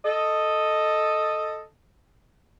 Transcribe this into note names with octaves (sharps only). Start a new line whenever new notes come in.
A4 D#5